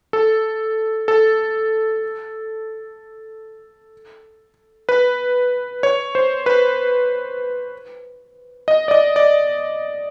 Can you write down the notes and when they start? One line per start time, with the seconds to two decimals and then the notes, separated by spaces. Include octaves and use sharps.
0.13 A4
1.08 A4
4.89 B4
5.83 C#5
6.15 C5
6.46 B4
8.68 D#5
8.88 D5
8.91 D#5
9.16 D5